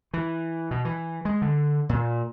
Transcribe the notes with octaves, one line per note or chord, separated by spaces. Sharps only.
E3
B2
E3
G#3
D3
A#2